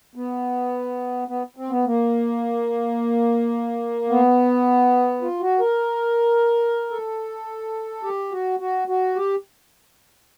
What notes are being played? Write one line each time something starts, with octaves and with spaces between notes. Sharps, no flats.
B3
B3
C4
B3
A#3
B3
F4
F#4
A#4
A4
G4
F#4
F#4
F#4
G4